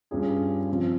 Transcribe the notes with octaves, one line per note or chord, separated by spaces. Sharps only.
G2 G3 C#4 F4 G#4
F3 C4 F4